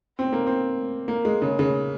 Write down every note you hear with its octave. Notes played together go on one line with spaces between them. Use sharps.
C4
A#3
C4
A#3
G#3
C#3
C#3